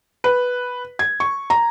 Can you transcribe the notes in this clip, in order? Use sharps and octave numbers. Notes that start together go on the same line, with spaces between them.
B4
G#6
C#6
A#5